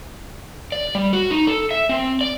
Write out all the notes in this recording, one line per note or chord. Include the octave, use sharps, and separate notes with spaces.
D5
G3
F#4
D#4
A4
E5
C4
D5